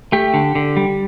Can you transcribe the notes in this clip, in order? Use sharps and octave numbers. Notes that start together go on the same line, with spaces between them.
A3 G4
D3
D3
G3